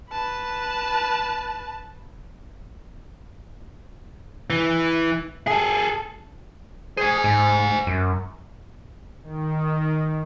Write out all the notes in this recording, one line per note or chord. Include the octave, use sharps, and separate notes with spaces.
B4 A5
E3
G#4 A4
G#4 C5 G#5
G#2
F#2
D#3